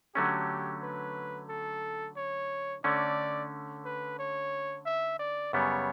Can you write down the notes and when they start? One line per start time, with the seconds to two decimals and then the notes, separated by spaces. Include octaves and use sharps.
0.15 D3 F#3 A3 C#4 G4
0.83 B4
1.49 A4
2.17 C#5
2.84 D3 A3 C#4 D5
3.85 B4
4.19 C#5
4.86 E5
5.19 D5
5.53 F#2 C#3 G3 B3 C#5